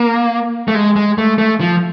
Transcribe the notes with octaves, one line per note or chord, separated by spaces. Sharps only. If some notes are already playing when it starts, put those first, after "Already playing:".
Already playing: A#3
A3
G#3
G#3
A3
A3
F3